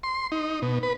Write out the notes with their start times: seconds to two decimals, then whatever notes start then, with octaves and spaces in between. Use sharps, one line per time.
0.03 C6
0.32 D#4
0.62 B2
0.83 B4